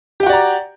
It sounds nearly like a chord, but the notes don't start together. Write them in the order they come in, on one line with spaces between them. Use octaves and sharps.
G4 G5 F#4 D5 A#5